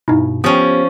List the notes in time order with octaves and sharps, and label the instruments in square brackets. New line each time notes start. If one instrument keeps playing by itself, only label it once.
[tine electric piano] G2 B2 [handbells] D#4 E4
[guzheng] F3 C#4 [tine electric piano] B3 G4 [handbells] D#6